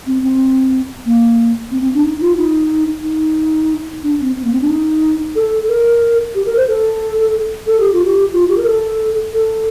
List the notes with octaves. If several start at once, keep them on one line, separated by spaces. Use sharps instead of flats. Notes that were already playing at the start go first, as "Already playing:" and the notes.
C4
C4
A#3
C4
C4
D4
D#4
F4
D#4
D#4
D4
C4
C4
A#3
C4
D4
D#4
A4
A#4
G4
A#4
C5
A4
A4
G4
F4
G4
F4
G4
A#4
A4
A4